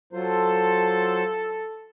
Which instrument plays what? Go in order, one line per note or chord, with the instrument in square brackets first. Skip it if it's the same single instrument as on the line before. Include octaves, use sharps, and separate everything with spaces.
[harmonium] F#3 F4 C5 [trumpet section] A4